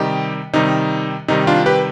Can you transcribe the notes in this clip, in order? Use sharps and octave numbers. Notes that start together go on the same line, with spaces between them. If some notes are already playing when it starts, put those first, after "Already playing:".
Already playing: C3 D#3 G3 D#4 G4
C3 D#3 G3 D#4
C3 D#3 G3 D#4
D4 F4
G4 B4